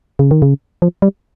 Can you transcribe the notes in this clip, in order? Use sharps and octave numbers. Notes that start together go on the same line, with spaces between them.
C#3
D#3
C#3
F3
G3